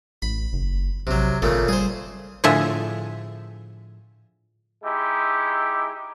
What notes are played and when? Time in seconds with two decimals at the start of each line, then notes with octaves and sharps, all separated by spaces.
0.22 A1 B5
0.53 F#1
1.07 A#1 C3 F#3
1.42 G#1 A#2 C#3 A3
1.68 G3 G#4 C5
2.44 A2 D3 F3 G#4 E5
4.83 G#3 D#4 E4 G4